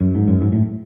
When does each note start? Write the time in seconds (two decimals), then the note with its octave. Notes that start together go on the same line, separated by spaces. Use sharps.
0.01 F#2
0.15 G#2
0.28 F#2
0.41 G#2
0.52 A2